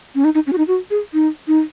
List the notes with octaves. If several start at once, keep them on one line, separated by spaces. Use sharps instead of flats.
C#4
D#4
D#4
C#4
F#4
D#4
F#4
G#4
D#4
D#4